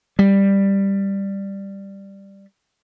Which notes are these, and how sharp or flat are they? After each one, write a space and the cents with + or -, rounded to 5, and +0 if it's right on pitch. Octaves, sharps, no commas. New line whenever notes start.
G3 +5